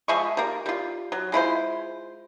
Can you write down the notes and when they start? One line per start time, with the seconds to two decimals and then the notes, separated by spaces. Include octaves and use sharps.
0.08 F3 G#3 E5 C#6
0.37 G3 A#3
0.66 G3 F4
1.12 F#3
1.32 G#3 E4 F4 C5